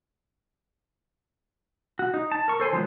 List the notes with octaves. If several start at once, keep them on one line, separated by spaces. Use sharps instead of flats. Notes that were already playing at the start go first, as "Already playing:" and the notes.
F#4
D#4
A5
A#4 C#6
A4 C5 G#5 C6
D#3 F3 F#3 G#3 B3